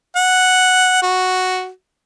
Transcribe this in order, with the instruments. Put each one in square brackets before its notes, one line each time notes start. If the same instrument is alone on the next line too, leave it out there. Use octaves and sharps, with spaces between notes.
[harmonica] F#5
F#4